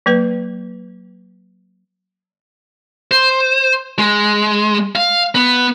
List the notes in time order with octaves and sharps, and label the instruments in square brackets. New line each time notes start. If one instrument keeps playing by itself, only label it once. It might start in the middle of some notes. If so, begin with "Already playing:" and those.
[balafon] F#3 A#3 B4
[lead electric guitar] C5
G#3
F5
B3